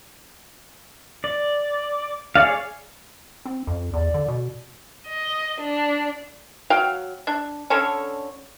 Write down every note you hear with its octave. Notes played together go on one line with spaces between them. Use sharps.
D5
G#4 C#5 D5 F5
C4
F2
E2 D5
D3
B2
D#5
D4
F#3 F5 G5
D4
D3 C#4 A4 C#5